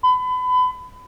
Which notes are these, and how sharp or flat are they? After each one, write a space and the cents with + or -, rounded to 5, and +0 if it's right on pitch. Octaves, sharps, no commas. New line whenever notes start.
B5 +30